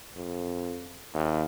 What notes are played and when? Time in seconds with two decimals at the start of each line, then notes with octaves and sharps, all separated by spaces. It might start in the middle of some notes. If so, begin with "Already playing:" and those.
0.16 F2
1.14 D#2